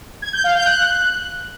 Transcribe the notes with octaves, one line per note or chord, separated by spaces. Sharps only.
G#6
G6
F5
G6
F#6